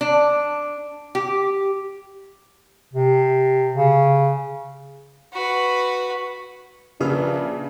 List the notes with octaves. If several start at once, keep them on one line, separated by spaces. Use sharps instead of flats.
D4
G4
C3
C#3
F#4 B4
A#1 C#3 D4 B4 E5 F6